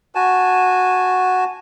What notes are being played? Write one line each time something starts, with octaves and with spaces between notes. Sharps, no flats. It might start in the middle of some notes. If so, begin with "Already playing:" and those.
F#4 G#5 A5